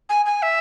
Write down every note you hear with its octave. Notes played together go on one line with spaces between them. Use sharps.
G#5
G#5
E5